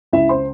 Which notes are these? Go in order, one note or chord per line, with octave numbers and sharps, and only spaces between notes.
C#2 E4 E5
C5 C6